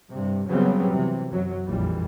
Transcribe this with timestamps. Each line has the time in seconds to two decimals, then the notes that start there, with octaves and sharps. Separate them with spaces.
0.12 G2 C3
0.48 C#3 F#3 G3 B3 C4
0.92 C3 E3
1.30 F#2 F#3
1.66 A#1 F2 E3 G3